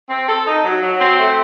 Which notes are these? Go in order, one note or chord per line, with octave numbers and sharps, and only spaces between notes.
C4
A4
D#4
F#3
F#3
C4
A3